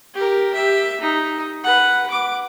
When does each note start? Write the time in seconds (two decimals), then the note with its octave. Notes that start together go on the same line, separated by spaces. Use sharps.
0.14 G4 A#4
0.54 G4 E5
1.01 D#4
1.64 B4 F#5
2.10 D6